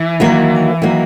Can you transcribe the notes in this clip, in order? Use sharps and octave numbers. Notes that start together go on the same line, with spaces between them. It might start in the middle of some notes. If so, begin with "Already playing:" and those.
Already playing: E3
D#3 F#3 A#3
D#3 F#3 A#3